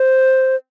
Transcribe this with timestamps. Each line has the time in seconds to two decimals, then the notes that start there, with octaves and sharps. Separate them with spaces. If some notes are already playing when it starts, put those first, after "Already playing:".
Already playing: C5